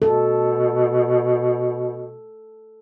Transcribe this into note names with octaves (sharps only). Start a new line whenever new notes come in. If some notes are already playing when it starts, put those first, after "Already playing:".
B2 A4